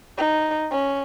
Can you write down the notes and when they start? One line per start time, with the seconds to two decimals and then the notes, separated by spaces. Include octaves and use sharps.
0.18 D#4
0.72 C#4